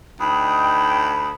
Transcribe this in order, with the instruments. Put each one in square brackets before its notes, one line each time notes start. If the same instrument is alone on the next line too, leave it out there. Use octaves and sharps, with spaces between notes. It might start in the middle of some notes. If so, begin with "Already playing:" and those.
[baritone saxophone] D2 [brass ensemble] D#4 G5 [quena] B5 [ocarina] D#6